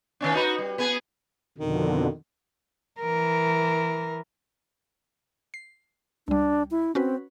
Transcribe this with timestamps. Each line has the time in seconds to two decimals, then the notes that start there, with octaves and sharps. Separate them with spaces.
0.20 D#3 C#4 D4
0.34 D#4 F#4 B4
0.58 G3
0.78 B3 G#4
1.58 F2 B2 D3 D#3
3.01 E3 A#4
5.54 C7
6.28 C#2 G3 D4
6.71 E4
6.95 C4 C#4 F#4 B4